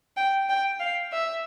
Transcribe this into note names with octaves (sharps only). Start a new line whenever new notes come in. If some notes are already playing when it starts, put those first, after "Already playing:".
G5
G5
F5
E5